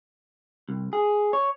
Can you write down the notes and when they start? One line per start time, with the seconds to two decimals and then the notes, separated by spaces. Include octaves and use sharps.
0.69 C2
0.93 G#4
1.33 C#5